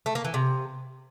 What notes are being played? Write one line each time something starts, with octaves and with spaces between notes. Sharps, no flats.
A3
A#3
E3
C3